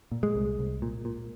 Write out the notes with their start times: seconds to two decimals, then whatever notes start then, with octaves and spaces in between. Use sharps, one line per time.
0.12 A#2
0.23 G#3
0.36 C2
0.59 C2
0.82 A#2
1.05 A#2